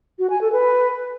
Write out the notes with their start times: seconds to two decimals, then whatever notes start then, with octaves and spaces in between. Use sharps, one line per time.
0.19 F#4
0.30 G#5
0.41 A4
0.52 B4